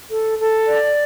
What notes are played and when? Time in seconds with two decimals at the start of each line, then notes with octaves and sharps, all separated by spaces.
0.11 A4
0.39 A4
0.67 D5